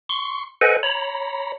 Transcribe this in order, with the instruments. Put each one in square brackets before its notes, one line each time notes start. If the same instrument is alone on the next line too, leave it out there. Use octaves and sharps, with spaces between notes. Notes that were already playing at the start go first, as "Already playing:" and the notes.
[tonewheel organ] C6 C#6
A4 B4 C5 D#5 F#5 G#5
C#5 A#5 B5